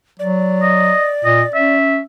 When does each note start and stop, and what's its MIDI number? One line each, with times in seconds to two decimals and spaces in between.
0.19 0.93 54
0.19 1.77 74
0.62 1.09 75
1.25 1.43 46
1.25 1.43 75
1.54 2.00 61
1.54 1.99 76